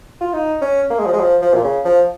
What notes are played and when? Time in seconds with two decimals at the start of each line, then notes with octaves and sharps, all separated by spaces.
0.21 F4
0.33 D#4
0.61 C#4
0.90 A#3
0.99 G#3
1.06 F3
1.13 G#3
1.20 F3
1.42 F3
1.54 A#2
1.64 C#3
1.85 F3